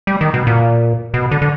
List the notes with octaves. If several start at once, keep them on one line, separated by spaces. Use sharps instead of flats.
G3
D#3
B2
A#2
B2
D3
D3